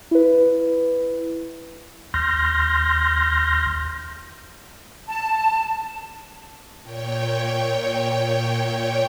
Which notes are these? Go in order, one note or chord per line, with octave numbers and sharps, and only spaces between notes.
E4 B4
D#2 C6 F6 G6 A#6
A5
A#2 C#5 G5